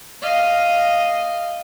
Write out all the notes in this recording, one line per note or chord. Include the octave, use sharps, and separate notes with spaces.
D#5 F5